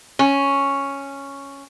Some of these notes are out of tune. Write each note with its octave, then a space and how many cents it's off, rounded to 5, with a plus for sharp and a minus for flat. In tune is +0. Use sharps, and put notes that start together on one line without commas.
C#4 +0